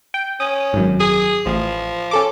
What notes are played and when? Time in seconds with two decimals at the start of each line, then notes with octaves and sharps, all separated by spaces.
0.14 G5
0.40 C#4 D#6
0.73 G#1 F#2
1.00 G#4
1.46 A1 F3
2.11 C#4 A4 D6